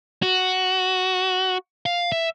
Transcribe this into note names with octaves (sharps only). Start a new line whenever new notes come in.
F#4
F5
E5